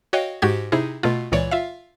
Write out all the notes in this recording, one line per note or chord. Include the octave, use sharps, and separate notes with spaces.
F#4 C#5 D#5 F5 G5
G#2 F#4 G4 G#6
C3 D#4 E4 G#4
B2 A3 F4
C#2 A#2 E3 C#5 D5
F4 E5 F5